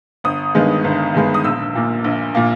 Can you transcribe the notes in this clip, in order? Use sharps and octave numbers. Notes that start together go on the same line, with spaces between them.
G1 D#6
G2 D#3 G#3 B3
G1
G2 D#3 G#3 B3
D#6
A#1 E6
A#2 A#3
A#1
A#2 A#3